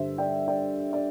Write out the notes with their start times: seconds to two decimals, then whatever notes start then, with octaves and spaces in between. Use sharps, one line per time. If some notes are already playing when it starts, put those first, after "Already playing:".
Already playing: G2 D3 G3 C5 E5
0.18 D5 G5
0.48 D5 G5
0.93 D5